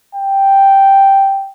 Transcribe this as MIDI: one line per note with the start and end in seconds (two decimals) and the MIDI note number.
0.15 1.51 79